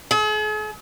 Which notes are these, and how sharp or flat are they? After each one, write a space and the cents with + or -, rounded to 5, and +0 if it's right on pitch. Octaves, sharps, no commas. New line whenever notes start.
G#4 +45